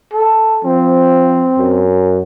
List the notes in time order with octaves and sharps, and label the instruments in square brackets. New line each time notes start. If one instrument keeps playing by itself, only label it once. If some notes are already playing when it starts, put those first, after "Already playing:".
[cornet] A4
[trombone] F3 [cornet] C4
[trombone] F#2